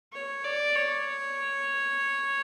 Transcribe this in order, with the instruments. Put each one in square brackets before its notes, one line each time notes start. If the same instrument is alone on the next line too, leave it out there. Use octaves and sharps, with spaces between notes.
[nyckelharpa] C#5
D5
C#5